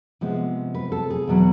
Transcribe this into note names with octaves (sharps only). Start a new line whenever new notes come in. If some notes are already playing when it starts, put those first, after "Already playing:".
C3 F3 G#3 B3
B4
A4
G#4
E2 B2 F#3 B3